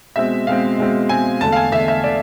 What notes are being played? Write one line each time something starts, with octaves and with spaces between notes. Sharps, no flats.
B2 G#3 C4 E5
B2 G#3 C4 F5
B2 G#3 C4
B2 G#3 C4 G#5
E2 D3 A3 A5
F5
G#5
E2 D3 A3 E5
E5
D3 D5